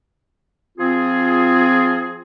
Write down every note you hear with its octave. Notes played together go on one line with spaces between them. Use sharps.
F3 C4 F4 G#4